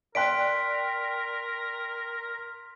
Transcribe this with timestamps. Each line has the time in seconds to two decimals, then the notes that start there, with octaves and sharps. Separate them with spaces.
0.15 A#4 D5 G5 C6 F#6 B6 D7